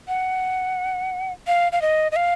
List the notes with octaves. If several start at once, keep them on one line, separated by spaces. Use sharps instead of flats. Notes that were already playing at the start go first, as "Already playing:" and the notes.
F#5
F5
F5
D#5
D#5
F5